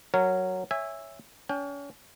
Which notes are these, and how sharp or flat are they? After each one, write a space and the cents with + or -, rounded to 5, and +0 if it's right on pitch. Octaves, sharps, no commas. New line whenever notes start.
F#3 +0 A#4 -15 C#5 +0
C#5 +0 E5 +0 G#5 -25
C#4 +35 G5 +30